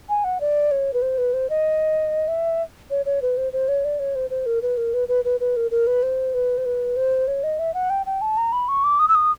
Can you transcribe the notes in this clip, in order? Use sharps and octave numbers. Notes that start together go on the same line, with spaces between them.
G#5
F#5
D5
C#5
B4
C5
B4
C5
D#5
E5
C#5
C#5
B4
C5
C5
C#5
D5
C#5
C5
C5
A#4
B4
A#4
B4
B4
B4
B4
A#4
A#4
B4
C5
B4
C5
B4
C5
C#5
D#5
E5
F#5
G5
G5
A5
A#5
B5
C#6
D6
D#6
E6
D#6